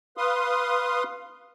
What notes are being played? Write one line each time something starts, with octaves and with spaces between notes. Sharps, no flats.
B4 F5 C6 D#6